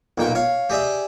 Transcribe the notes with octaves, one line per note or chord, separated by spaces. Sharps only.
B1 A#2 G5 C#6
C#5 F5
G4 G#4 D5 E5